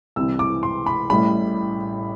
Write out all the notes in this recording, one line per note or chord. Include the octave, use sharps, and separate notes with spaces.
C2 C3 E3 E6
D6
C6
B5
A1 A2 G3 B5